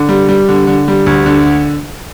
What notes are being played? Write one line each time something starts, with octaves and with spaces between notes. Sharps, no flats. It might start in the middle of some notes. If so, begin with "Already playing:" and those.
Already playing: D3
G3
G3
D3
D3
G3
D2
D3